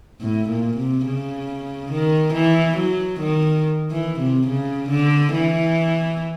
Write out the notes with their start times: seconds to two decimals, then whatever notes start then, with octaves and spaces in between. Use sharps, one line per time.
0.21 A2
0.49 A#2
0.77 C3
1.06 C#3
1.91 D#3
2.34 E3
2.77 F#3
3.20 D#3
3.91 E3
4.20 C3
4.47 C#3
4.90 D3
5.33 E3